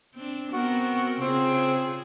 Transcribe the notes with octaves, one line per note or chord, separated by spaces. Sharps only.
C4 D4
B3 C4 F#4 A#4
C#3 C4 F4 G#4